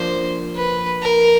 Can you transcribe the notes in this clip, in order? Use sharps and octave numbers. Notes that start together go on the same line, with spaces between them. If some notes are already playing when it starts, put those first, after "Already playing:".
Already playing: F3 A#3 D4 C5
B4
A#4